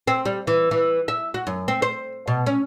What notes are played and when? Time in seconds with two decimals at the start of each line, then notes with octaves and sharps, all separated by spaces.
0.08 C4
0.25 G3
0.47 E3
0.71 E3
1.08 E5
1.34 F#4
1.47 F#2
1.68 C4
1.82 C5
2.28 B2
2.46 C#4